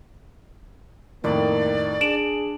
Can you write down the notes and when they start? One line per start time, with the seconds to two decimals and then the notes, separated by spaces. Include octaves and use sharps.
1.24 F2 A2 D#3 A#3 D5
2.01 D4 G#4 D7 E7 F#7